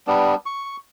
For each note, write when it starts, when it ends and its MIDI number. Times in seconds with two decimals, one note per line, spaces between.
0.07 0.35 55
0.07 0.35 59
0.07 0.35 62
0.46 0.76 85